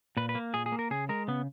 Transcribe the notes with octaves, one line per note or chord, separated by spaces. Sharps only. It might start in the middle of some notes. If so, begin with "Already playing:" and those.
A#2 B4
B4
A#3
A#2 G#4
G#4
A#3
A#4
C#3 G#4
G#3 A#4
C#3 B3